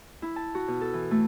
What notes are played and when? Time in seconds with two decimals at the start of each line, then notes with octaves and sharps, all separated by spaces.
0.22 E4
0.36 A5
0.55 F#4
0.68 B2
0.81 A4
0.93 E3
1.11 A3